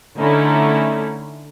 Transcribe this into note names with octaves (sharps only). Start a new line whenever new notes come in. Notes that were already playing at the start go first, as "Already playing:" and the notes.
D3 A3 C#4 D#4 E4